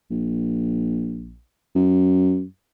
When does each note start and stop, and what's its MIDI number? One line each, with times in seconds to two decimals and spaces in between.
0.11 1.40 34
1.75 2.44 42